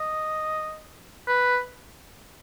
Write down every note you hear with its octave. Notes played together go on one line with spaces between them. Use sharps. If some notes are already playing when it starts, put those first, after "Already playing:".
Already playing: D#5
B4